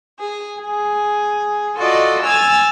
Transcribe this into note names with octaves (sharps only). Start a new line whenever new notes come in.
G#4
G#4
F4 F#4 A4 D5 D#5
G#5 E6 F6 G#6 A6